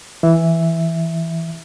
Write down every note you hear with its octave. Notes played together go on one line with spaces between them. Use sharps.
E3 E5